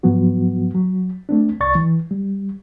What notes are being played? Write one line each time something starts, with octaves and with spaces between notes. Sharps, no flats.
G#2 F3 F#3 B3 F#4
F#3
A3 C4 D4
C2 D5 C#6 A6
E3
G3